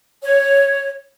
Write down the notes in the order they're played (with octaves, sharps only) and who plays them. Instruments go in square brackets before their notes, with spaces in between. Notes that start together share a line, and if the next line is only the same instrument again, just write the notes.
[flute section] C#5